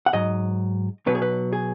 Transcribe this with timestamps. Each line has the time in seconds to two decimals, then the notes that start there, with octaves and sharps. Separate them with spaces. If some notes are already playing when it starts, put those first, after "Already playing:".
0.06 F#5
0.13 G#2 F#3 D#5
1.06 B1 B2 F#3 B4
1.15 G#4
1.22 B4
1.53 G#4